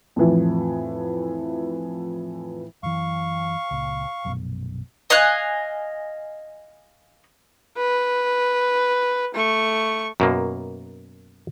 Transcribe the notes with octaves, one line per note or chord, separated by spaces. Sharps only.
F2 A2 E3 F3
F#2 E3 F5 C#6
C#2 A#2
A#1 F#2 B2
D#5 F5 G#5 F#6
B4
A3 C#6
F#2 B2 A#3